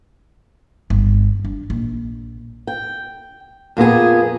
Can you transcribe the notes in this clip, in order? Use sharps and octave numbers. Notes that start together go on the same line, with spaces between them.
G1
D4
A#1
G5
F2 A#2 B3 G#4